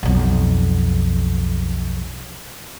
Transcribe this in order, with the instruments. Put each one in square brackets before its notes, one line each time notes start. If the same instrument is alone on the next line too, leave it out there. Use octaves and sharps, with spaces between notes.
[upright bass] B1 F2